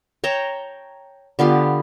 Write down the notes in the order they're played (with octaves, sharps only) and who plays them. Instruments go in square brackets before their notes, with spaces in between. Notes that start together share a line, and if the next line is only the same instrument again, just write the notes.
[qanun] C#5 G5 A5 A#5
D3 B3 F4 G4